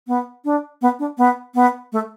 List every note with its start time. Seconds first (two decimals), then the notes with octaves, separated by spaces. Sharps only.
0.07 B3
0.45 D4
0.82 B3
0.99 D4
1.18 B3
1.55 B3
1.92 A3